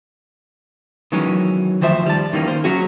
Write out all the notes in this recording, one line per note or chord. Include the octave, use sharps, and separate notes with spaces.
D#3 E3 F#3 G#3 B3 C#4
D2 D#3 F3 C5 E5
G3 A5
D#3 E3 A#3 C#4
A#3 C5
F#3 C#4 F#4 G#4